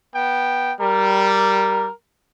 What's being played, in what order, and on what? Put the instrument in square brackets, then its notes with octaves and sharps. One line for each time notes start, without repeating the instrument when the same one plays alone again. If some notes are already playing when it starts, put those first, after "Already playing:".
[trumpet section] B3 G5
[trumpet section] G3 [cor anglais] A#4